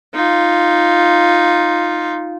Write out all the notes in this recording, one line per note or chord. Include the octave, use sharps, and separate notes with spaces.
D#4 F4